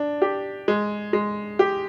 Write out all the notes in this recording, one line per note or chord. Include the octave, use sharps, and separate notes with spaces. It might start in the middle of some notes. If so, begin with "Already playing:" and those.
Already playing: D4
G4
G#3
G#3
G4